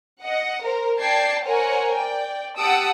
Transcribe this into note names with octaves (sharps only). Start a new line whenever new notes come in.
D#5 F#5
A#4 C5
D5 G5 A5 G#6 C7
A#4 C5 C#5 F#5 G#5
D5 G5
G4 F#5 A5 D#6 E6 D7